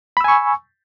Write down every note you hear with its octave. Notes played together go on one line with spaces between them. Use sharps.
G#5 B5 C#6 E6